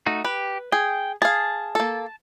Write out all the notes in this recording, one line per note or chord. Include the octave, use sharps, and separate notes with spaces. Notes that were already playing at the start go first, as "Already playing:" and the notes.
A3 D#4 F#4
G4 B4
G#4 G5
G#4 F5 A5
A#3 A4